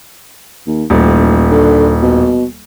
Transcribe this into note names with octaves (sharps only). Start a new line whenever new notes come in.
D#2
D#1 A1
D3
B2